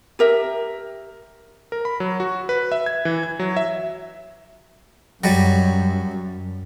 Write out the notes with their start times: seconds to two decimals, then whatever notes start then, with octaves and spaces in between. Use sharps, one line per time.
0.19 G4 A#4 E5
1.72 A#4
1.85 B5
2.00 F#3
2.20 F#4
2.49 B4
2.72 E5
2.86 G#6
3.05 E3
3.23 G#6
3.39 F#3
3.57 E5
5.24 F#2 F#3 G3